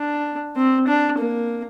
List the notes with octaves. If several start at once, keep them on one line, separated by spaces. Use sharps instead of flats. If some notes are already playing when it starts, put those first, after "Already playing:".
Already playing: D4
C4
D4
A#3